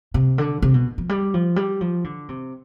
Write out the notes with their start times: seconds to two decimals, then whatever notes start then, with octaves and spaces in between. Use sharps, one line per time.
0.14 C3
0.38 D3
0.62 C3
0.74 B2
0.98 F3
1.09 G3
1.34 F3
1.56 G3
1.81 F3
2.04 D3
2.29 C3